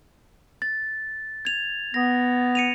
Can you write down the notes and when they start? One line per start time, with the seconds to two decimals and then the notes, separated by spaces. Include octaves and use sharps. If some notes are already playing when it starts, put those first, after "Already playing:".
0.62 A6
1.45 G#6 F7
1.94 B3 A#6
2.55 C#7 D#7 F7